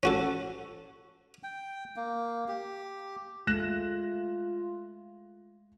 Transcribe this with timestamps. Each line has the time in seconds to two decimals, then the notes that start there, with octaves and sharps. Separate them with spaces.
0.03 C#4 F#4 A4
1.43 G5
1.96 A#3
2.48 G4
3.47 G#3 A3 F4 F#6 A#6 E7